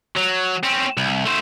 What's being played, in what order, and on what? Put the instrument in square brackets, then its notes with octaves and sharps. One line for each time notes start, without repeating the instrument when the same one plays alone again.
[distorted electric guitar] F#3
C4 C#4
C2
A3 C5